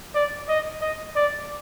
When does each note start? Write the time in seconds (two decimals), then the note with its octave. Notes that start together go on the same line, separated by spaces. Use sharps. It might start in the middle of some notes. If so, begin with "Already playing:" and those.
0.15 D5
0.49 D#5
0.81 D#5
1.16 D5